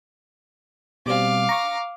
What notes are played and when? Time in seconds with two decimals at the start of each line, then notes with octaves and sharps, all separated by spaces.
1.06 B2 G3 C4 F5 D6
1.49 A#5 C#6 A#6